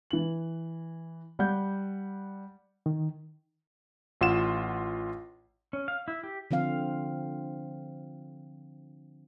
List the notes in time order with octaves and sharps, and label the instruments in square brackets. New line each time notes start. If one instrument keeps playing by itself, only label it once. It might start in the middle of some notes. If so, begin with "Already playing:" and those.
[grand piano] E3 F#7
G3 F#5 G6
[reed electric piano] D#3
[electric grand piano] A1 F4 F#5 E7
[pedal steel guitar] C#4
F5
E4
G4
[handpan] D3 F3 C4 F5